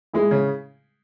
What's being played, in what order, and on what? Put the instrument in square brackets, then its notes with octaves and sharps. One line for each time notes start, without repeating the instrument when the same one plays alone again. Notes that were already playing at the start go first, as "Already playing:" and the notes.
[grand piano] G#3 [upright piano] E4 G#4
[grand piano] C#3